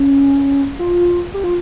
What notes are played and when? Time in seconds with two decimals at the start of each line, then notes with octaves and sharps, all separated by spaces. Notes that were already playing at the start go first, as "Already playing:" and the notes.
Already playing: C#4
0.79 F4
1.34 G4
1.44 F4